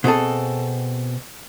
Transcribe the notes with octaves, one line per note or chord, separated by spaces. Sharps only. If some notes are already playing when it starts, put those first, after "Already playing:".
B2 C4 G#4 A4